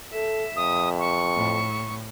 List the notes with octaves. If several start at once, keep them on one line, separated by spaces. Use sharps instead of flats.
A4 E5
F2 D#6
C#6
A2